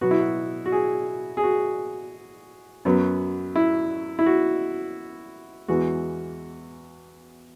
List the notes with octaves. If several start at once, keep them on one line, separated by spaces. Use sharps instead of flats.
B2 F#3 B3 F#4
E4
F#4
F#4
G#4
G#4
F#4
F#2 F#3 B3
E4
E4
F#4
E2 E3 G#3 F#4